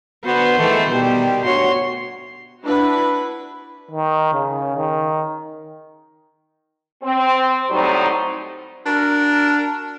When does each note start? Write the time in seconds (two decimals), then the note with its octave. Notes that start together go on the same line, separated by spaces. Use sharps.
0.24 D3 B3 F#4 C5
0.57 D#3 E3 G#3 A3
0.91 B2 D#3 G3 G4
1.44 D2 F#4 C#5 C6
2.64 D4 E4 F#4 B4
3.91 D#3
4.33 C#3
4.78 D#3
7.04 C4
7.70 A2 F#3 G3 C4 D#4 C5
8.86 D4 F#4 A#4